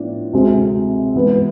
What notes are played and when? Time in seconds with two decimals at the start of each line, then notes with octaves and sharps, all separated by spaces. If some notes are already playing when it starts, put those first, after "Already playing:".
Already playing: A2 F3 B3 D4
0.33 D2 C3 G#3 C4
1.15 G#2 E3 B3 E4 B4